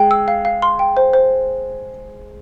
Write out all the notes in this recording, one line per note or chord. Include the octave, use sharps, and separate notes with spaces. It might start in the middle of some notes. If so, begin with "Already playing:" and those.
Already playing: G#3 G5
E6
F5
F5
C6
G5
C5
C5